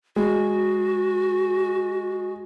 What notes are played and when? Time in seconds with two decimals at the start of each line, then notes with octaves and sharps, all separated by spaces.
0.16 G#3 F#4